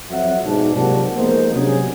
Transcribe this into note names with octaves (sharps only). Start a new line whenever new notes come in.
F2 F#3 C4 E5 F#5
G#2 B2 D4
C3 F3 F#3 A#3 D4 F#4
F3 G#3 A#3 B3 D#4 C5
C3 F#3 C#4 D4 G#4